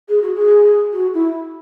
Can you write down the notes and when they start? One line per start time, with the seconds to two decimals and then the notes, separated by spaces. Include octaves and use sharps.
0.09 G#4
0.22 F#4
0.34 G#4
0.93 F#4
1.14 E4